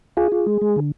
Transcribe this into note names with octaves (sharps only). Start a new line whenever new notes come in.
F4 G#4
F4
G#3
G#3
D3